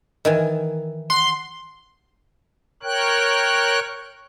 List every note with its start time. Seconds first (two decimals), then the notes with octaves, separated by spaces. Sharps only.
0.25 D#3 E3 G#5
1.10 F#5 C6
2.83 A#4 C#5 G5 F#6